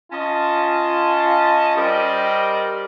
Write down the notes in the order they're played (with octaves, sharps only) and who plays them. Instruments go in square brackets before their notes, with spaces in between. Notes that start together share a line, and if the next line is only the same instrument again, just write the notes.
[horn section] C#4 F4 D#5 G#5 A5
G3 G4 A#4 C5 D5 D#5